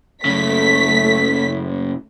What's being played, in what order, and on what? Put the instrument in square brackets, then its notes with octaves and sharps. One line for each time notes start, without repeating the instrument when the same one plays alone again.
[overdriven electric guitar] F#2 C#3 [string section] A3 B6